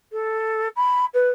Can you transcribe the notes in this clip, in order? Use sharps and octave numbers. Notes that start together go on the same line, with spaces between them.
A4
B5
B4